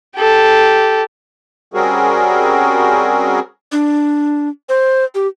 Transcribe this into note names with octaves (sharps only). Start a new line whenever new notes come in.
G4 A4
G3 C4 C#4 F#4 G#4 A#4
D4
C5
G4